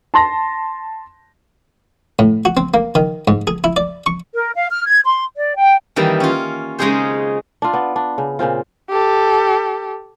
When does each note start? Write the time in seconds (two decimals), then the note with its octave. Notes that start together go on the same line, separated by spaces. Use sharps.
0.14 A5 C6 A#6
2.19 A2
2.45 F#4
2.57 C4
2.74 A#3
2.95 D#3
3.28 G#2
3.47 G#4
3.64 E4
3.76 D5
4.06 C#6
4.35 A#4
4.57 F5
4.71 F6
4.85 G#6
5.04 C6
5.36 D5
5.57 G5
5.96 D#3 E3 G3 A#3
6.20 C#4 F4
6.79 C#3 G#3 C#4 D#4 G#4 C5
7.62 D4 F4
7.73 B3 D5
7.96 D4
8.18 C#3
8.39 A#2 C#3 C4 F4
8.90 G4 A4